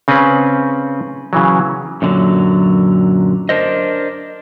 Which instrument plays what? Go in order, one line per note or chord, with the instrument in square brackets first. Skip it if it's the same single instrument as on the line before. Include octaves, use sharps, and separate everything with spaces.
[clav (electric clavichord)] C#3 C4 C#4 B4
C#3 E3 F#3
[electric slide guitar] F#2 A#2 D3 F#3
D4 A#4 C5 D#5